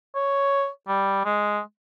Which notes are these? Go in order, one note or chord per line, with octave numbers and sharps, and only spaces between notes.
C#5
G3
G#3